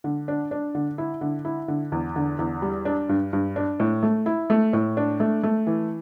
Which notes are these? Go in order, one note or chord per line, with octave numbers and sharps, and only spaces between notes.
D3
D4
D4
D3
E4
D3
E4
D3
E2
D3
E2
G3
D4
G2
G2
D4
A2
A3
E4
A3
A2
D4
A3
A3
E3